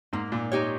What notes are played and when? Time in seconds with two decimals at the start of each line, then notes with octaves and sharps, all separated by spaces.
0.13 G#2 A#3
0.32 A#2
0.52 D#4 G4 C#5